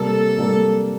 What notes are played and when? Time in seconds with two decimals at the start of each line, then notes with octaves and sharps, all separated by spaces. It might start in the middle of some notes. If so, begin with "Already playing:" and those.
Already playing: C3 G3 A#3 A4
0.38 C3 G3 A#3